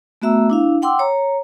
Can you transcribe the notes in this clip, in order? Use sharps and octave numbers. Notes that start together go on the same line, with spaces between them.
A3 B3 F#4 E5 A#5 E6
D4 E4 F5
F#5 G5 C6 D6 E6
C#5 A#5